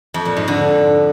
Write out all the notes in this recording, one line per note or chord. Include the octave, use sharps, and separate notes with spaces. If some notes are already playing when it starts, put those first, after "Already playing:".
F2
A#2
G#2
D3